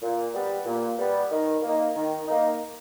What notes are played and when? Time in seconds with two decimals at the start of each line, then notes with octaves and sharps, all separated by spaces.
0.02 A#2
0.34 G3 B3
0.66 A#2
0.99 G3 B3
1.31 D#3
1.62 A#3 D#4
1.95 D#3
2.27 A#3 D#4